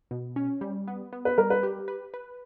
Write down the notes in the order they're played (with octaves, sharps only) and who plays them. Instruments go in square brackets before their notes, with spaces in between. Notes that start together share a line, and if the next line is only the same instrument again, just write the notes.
[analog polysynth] B2
C#4
G3
B3
B3
[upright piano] B4
[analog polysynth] G3 [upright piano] A#4
[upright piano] B4
[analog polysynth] G4
B4
B4